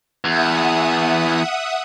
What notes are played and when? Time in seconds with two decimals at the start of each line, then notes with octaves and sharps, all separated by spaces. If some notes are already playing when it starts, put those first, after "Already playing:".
0.24 E2 E5 F#5 D#6